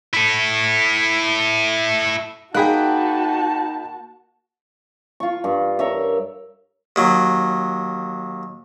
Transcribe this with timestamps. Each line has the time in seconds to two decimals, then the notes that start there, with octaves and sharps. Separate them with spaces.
0.14 E4 A4
2.54 A#3 D#4 F#4 G#4 G5 A5 B5 F#6
5.20 F4 C#6
5.44 G2
5.79 A#4 C#5 E5
6.96 D#2 F#3